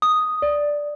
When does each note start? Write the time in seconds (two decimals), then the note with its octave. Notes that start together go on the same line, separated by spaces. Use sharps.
0.02 D#6
0.42 D5